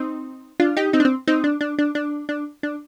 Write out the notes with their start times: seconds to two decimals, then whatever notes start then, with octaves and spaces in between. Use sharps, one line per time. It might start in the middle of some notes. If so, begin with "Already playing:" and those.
Already playing: C4 D#4
0.60 D4 F4
0.77 D#4 G4
0.93 C4 D#4
1.00 D4
1.05 C4
1.28 C4 D#4
1.44 D4
1.61 D4
1.78 D4
1.95 D4
2.29 D4
2.63 D4